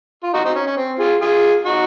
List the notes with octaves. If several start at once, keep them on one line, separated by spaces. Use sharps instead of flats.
F4
D#4 F#4
C4 D#4
C#4
C#4
C4
F4 G#4
F4 G#4
D#4 F#4